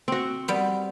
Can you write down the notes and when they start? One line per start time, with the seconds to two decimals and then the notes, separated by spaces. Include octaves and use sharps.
0.08 C4 F#4
0.48 G3 B3